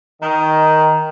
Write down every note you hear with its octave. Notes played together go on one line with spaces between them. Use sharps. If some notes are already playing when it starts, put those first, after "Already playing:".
D#3